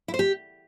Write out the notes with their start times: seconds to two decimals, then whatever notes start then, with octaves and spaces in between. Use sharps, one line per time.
0.08 E4
0.14 C5
0.19 G4